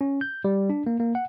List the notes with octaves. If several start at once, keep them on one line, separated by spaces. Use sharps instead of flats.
C#4
G6
G3
D4
A#3
A#3
F#5